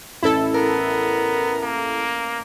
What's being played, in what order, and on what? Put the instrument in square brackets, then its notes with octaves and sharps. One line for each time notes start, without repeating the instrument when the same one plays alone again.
[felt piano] A1 [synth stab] E4 A4
[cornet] B3 [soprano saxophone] A#4
[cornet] A#3